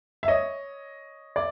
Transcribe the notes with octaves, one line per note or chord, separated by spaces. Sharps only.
E5
C#5 D#5
D5